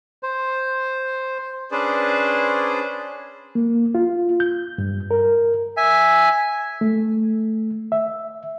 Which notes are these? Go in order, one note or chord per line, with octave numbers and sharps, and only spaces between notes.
C5
C#4 D4 G#4 B4 C5 D5
A#3
F4
G6
G2
A#4
E5 G#5
A3
E5